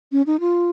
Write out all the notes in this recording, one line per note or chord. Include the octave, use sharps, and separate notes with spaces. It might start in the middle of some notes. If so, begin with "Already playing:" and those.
C#4
D#4
F4